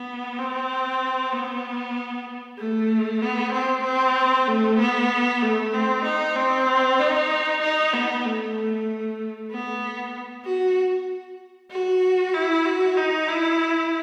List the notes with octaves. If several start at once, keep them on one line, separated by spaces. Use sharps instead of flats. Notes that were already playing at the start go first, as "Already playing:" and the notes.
Already playing: B3
C4
B3
A3
B3
C4
C4
A3
B3
A3
C4
D#4
C4
D#4
D#4
B3
A3
B3
F#4
F#4
E4
F#4
D#4
E4